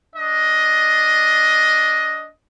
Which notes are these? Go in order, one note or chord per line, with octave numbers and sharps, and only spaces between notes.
D4 D#5